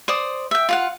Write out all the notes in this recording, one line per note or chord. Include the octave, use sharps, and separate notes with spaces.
C5 D5 D#6
E5 G5
F4 F5 F#5